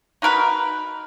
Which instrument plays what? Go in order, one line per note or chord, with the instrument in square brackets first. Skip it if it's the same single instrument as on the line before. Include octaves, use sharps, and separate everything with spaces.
[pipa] D#4 F#4 A#4 B4